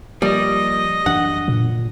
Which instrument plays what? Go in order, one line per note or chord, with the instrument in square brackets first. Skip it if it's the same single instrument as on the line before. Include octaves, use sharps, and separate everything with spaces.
[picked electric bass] F3 A#3 [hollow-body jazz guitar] G3 [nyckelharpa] D#5
[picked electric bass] F#2 E3 D4 [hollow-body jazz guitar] F#5
[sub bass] A#2